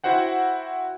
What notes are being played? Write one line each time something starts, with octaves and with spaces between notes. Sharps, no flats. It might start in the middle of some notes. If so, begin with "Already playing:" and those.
E4 F#4 C5 F#5 G5